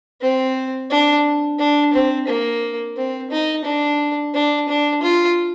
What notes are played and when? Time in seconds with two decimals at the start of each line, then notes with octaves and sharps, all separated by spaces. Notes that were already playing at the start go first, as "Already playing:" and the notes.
0.21 C4
0.90 D4
1.59 D4
1.93 C4
2.28 A#3
2.96 C4
3.31 D#4
3.65 D4
4.34 D4
4.68 D4
5.02 F4